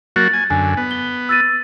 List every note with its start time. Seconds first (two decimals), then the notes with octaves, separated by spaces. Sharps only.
0.16 F#3 A#3 F#4 A6
0.33 G#5
0.50 F#2 D3 G#5
0.77 B3
0.91 G7
1.29 E6 A6 D#7